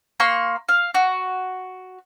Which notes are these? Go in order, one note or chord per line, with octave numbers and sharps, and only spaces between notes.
A#3 C6 C#6
F5
F#4